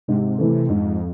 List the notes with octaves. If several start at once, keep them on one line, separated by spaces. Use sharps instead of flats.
G#2 C3
E3 A3
F2 G#2